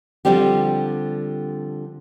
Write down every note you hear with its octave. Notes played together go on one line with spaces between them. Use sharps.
D3 F3 G3 C4 G4